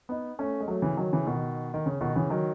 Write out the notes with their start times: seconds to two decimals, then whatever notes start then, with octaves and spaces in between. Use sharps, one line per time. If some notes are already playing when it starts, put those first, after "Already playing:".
0.09 B3 D#4
0.39 A3 C#4
0.60 G#3
0.68 F#3 A3
0.82 C#3 E3
0.97 D#3 F#3
1.13 C#3 E3
1.26 B2 D#3
1.74 D#3
1.86 C#3
2.01 B2 D#3
2.16 C#3 E3
2.30 D#3 F#3